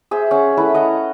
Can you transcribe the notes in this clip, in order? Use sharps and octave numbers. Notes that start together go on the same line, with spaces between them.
G#4 C5 E5
C#4 F#5
A3 E4 B4
D#5 F#5 A#5